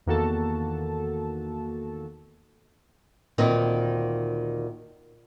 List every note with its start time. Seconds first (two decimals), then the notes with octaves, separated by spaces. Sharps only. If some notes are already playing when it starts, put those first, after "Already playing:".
0.06 E2 D#3 A#3 F#4 A4 A5
3.38 D2 A#2 D#3 C4 D#4 B4